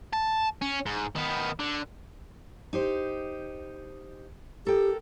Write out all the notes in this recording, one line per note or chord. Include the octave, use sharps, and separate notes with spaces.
A5
C#4
G#2
D#3 B3
D3
D#4 G4 C5
G4 A4 A#4 G5